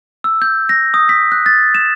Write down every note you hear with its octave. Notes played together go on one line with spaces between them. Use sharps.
E6
G6
A#6
D#6
B6
F#6
A6
E7